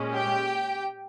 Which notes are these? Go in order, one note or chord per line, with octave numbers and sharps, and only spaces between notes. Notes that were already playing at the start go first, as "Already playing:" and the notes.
Already playing: A#2 G#3 C#4
G4 G5